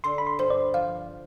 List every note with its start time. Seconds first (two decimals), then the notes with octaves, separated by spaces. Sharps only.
0.04 D3 C6
0.18 B5
0.27 C6
0.39 G2 C5
0.50 D5
0.74 F3 F5